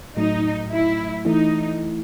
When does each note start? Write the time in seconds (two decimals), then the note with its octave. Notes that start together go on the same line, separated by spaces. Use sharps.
0.16 A2 F#3 A3 D#4
0.71 E4
1.25 E3 A3 D#4 E4